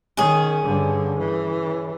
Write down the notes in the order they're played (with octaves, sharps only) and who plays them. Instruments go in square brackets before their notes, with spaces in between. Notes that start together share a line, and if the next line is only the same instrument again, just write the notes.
[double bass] D#3 [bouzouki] C#4 G#4
[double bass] G2 D3
E3